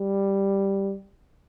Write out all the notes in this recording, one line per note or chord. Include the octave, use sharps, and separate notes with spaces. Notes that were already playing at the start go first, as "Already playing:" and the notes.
Already playing: G3